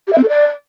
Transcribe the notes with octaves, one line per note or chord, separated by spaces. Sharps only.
G4
E5
C4
A4
D5